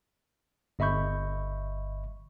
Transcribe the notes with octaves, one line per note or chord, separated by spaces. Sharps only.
G1 D#5 E5 B5 C#6 G6